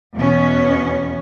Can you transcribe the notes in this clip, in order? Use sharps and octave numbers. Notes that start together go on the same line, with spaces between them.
E2 B2 B3 C#4